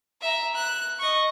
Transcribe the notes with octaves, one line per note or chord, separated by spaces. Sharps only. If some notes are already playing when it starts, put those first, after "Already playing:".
E5 A#5
F#6
D#5 C#6